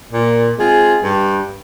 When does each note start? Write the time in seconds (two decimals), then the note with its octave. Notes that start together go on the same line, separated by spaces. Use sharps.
0.12 A#2
0.59 G#3 C4 F4 G#4
1.03 G2